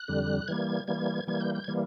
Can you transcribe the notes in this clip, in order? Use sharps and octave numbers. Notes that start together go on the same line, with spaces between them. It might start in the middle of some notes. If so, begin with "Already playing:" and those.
Already playing: F#6
F2 D3 G3
E3 G3 A#3 G#6
E3 G3 A#3 G#6
E3 G3 A#3 G#6
G6
G6
E3 G3 A#3 G#6